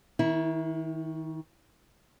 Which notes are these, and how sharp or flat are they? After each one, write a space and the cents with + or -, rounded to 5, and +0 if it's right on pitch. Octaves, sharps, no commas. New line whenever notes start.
D#3 +30 E4 -15